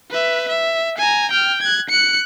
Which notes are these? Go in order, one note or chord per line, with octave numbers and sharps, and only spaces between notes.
B4 E5
E5
G#5 A#5
G5 F6
F#6 G#6
F#6 C#7